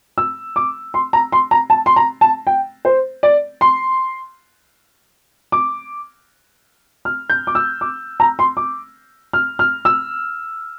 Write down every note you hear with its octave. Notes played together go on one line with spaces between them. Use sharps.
E6
D6
C6
A#5
C6
A#5
A5
C6
A#5
A5
G5
C5
D5
C6
D6
F6
G6
D6
E6
D6
A#5
C6
D6
F6
F6
E6